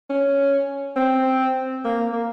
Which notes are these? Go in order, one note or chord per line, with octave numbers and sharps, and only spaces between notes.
C#4
C4
A#3
A#3